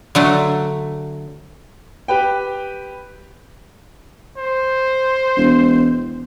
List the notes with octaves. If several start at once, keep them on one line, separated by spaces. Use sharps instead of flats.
D3 F#3 A3
G4 B4 G5
C5
E1